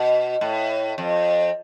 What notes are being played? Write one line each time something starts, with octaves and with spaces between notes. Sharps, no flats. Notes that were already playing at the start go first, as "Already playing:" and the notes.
Already playing: B2
A2
F2